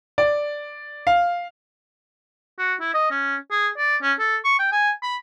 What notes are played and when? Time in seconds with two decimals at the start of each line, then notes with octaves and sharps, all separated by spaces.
0.18 D5
1.07 F5
2.59 F#4
2.80 E4
2.94 D#5
3.11 C#4
3.51 G#4
3.77 D5
4.02 C#4
4.19 A4
4.45 C#6
4.59 G5
4.72 G#5
5.03 B5